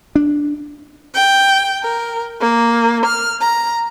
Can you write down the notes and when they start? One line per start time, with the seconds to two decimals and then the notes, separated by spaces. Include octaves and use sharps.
0.15 D4
1.15 G5
1.84 A#4
2.40 A#3
3.05 F6
3.40 A#5